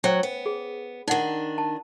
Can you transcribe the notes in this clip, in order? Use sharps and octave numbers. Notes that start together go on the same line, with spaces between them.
F#3 C#4 C5 G5
B3
G#4
D#3 D4 D#4 F#5
A5